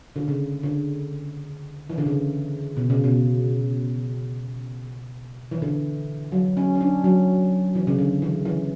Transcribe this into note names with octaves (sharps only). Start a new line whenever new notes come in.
D3
C#3
D3
E3
D3
C#3
B2
C#3
B2
E3
D3
F#3
C#4
C#4
D4
F#3
E3
C#3
D3
E3
E3